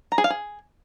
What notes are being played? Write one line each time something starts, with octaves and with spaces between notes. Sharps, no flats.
A#5
G#4
F5
G#4